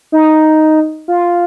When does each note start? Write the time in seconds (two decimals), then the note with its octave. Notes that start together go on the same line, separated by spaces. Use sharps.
0.12 D#4
1.08 F4